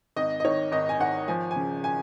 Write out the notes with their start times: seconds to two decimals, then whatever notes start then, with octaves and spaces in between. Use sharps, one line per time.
0.16 G#1 D#5
0.40 D#5
0.45 D#3 C#5
0.72 G#1 D#5
0.89 G#5
1.00 G#1 F#5
1.28 F3 G#5
1.51 G#5
1.56 C#3
1.84 G#5